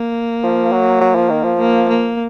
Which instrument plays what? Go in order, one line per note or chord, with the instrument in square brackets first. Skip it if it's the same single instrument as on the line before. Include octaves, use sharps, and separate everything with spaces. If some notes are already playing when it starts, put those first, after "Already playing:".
Already playing: [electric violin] A#3
[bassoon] F3
F#3
F#3
F3
D#3
F3
[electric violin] A#3
A#3